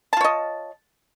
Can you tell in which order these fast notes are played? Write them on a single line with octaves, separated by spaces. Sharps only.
A5 F4 C#5 D#5